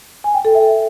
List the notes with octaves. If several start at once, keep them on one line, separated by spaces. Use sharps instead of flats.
G#5
G5
A4
E5